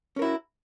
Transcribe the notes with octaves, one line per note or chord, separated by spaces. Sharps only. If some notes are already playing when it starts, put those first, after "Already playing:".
C#4 E4 F#4 A#4